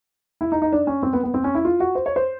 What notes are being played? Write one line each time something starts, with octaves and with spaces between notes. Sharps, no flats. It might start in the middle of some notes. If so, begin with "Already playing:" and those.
E4
D#4
D#4
D4
C#4
C4
B3
B3
C4
C#4
E4
F4
F#4
C5
C#5
C5